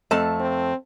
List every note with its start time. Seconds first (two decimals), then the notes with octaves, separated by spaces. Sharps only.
0.11 F2 A3 A5
0.40 C4